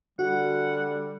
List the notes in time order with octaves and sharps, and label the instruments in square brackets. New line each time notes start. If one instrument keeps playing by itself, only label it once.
[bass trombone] D3 [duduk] G3 [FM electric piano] F#4 [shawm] F#5